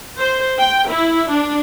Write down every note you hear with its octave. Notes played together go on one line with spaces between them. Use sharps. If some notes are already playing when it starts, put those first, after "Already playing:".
C5
G5
E4
D4